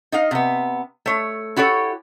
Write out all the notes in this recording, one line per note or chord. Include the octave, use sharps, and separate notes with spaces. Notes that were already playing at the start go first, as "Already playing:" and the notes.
D#4 D#5 F5
C3 B3
A3 C#5
E4 F#4 G4 A4 C#5